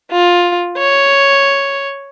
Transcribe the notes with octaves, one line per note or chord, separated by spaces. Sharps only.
F4
C#5